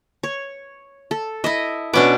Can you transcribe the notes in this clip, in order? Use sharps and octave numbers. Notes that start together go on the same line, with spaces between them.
C#5
A4
E4 D#5 E5
B2 B3 C#4 D4 D6